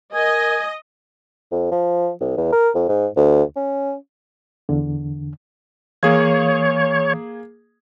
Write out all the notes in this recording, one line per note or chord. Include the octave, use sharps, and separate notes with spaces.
A#4 D#5 G#5
F2
F3
C2
E2
A#4
F2
G#2
D2
C#4
E2 D3
E3 A#3 G#4 C#5 F5 G#6